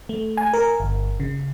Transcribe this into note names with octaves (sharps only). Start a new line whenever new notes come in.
A3
G#5
A#4
G1
C#3